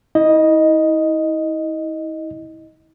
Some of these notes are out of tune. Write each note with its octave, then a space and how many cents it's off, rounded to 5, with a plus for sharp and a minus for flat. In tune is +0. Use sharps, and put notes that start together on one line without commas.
E4 -40 D#5 +0